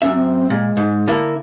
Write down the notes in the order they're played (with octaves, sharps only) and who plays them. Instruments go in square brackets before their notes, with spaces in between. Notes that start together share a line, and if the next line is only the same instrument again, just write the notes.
[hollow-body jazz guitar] F#2 C#3 E5 [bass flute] C#4
[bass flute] C4
[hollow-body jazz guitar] A#2 [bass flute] G#3
[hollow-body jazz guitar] G#2
D3 A#3 E4